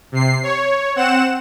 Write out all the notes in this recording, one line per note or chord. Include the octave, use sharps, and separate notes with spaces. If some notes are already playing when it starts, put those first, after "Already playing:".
C3 C7
C#5
C4 F#5 E7